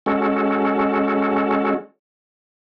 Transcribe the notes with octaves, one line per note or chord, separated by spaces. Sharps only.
G#3 C#4 F#4 A4